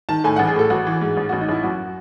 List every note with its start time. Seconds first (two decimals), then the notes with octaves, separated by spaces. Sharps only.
0.09 D#3 A5
0.24 A2 G#5
0.36 A1 F#5
0.47 G#4
0.56 A2 A4
0.70 A1 F#4
0.87 E3
1.01 G#2
1.17 A1
1.29 A1 F#4
1.41 D#4
1.49 A1 E4
1.63 F#2 F#4